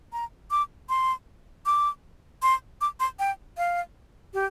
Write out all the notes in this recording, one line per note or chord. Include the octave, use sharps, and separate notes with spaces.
A#5
D6
C6
D6
C6
D6
C6
G5
F5
G4